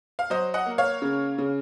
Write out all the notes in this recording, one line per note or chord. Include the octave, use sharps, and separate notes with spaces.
F5
F#3 C5 D#5
D#5 F#5
A#3
C#5 F5
C#3
C#3